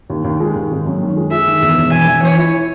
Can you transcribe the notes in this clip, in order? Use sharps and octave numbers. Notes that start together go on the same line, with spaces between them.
D#2
D#2
G#3
D#2
G#1
F#2
D#3
G#3
G#3 E5
D#3
E2
E1
E3 G#5
E3
E3 C#5
E4